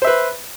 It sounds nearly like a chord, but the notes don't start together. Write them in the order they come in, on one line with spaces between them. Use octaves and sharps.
C5 E5 B4